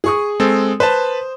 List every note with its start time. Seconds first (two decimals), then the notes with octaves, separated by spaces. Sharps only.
0.04 G#4 C#6 D#6
0.40 G#3 C4 A4
0.80 B4 C5 A5